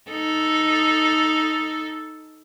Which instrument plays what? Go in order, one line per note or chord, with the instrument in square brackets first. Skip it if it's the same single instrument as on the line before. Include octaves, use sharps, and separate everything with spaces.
[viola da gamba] D#4 A4